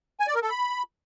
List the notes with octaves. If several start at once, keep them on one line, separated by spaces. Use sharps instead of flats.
G#5
D5
A#4
A4
B5